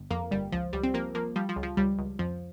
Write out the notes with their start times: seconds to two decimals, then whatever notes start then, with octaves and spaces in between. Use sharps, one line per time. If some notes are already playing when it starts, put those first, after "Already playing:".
Already playing: G1
0.10 F2 A#3
0.31 G1 G3
0.52 C#2 F3
0.73 C#2 G3
0.83 C4
0.94 F3 A#3
1.15 F3 A#3
1.36 F3 G3
1.49 F3
1.56 C#2
1.63 F3
1.77 C#2 G3
1.98 C#2
2.19 F2 F3